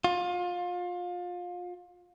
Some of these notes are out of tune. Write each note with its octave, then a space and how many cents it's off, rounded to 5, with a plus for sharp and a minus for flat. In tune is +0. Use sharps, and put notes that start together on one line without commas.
F4 +25